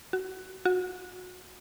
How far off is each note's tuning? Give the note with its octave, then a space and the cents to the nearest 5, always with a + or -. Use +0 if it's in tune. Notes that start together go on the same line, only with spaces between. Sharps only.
F#4 +20
F#4 -25